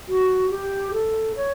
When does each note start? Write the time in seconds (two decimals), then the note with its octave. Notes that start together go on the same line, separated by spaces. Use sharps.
0.08 F#4
0.50 G4
0.93 A4
1.36 C#5